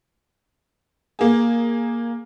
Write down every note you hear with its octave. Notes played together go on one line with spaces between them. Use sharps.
A#3 G#4